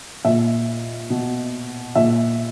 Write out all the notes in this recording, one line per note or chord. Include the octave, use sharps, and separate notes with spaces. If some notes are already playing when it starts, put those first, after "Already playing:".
A#2 E5
B2
A#2 E5